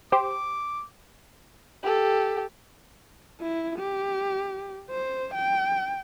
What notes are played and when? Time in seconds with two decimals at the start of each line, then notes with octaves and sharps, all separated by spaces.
0.12 G4 C5 D6
1.83 G4 A4
3.41 E4
3.79 G4
4.91 C5
5.34 G5